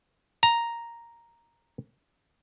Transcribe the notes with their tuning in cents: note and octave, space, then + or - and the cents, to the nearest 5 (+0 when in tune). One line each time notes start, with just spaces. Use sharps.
A#5 +0